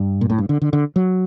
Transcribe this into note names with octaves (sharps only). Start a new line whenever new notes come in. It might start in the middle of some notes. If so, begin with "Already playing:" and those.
Already playing: G2
A#2
A2
G2
D3
D3
D3
F#3